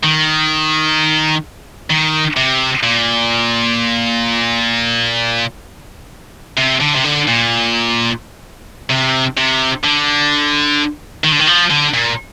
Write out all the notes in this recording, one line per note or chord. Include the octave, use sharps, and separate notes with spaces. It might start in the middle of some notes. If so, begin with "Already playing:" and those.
D#3
D#3
C3
A#2
C3
D3
C3
D3
A#2
C3
C3
D3
D#3
D3
D#3
F3
D3
A#2